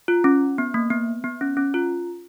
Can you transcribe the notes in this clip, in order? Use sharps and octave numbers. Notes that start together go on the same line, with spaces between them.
F4
C#4
B3
A#3
B3
B3
C#4
C#4
F4